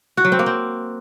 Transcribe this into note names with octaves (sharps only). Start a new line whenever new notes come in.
F#4
F#3
C4
A#3
C4